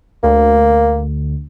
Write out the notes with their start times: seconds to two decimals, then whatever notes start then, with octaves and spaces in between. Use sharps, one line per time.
0.23 D2 A#3